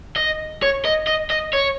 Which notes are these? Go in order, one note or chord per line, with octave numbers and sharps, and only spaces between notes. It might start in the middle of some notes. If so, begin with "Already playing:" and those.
D#5
C#5
D#5
D#5
D#5
C#5